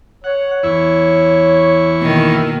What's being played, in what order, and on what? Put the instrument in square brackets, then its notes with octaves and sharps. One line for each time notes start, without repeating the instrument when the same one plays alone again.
[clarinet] C#5 [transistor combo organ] F#5
[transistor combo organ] E2 E4 C#6
[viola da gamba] B2 D#3 A#3